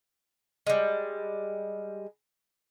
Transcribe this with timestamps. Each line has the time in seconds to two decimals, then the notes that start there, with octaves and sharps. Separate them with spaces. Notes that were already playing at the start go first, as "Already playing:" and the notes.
0.67 G3 G#3